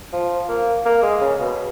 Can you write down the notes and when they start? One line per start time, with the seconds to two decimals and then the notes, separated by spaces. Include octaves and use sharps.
0.13 F3
0.48 A#3
0.86 A#3
1.02 G#3
1.21 C#3
1.40 B2